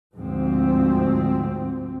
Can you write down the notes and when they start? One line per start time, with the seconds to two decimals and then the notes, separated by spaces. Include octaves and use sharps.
0.16 D2 G#2 F3 C4